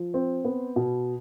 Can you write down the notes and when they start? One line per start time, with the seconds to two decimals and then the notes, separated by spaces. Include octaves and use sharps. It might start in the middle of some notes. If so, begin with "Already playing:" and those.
Already playing: F3
0.14 C4
0.45 B3
0.76 B2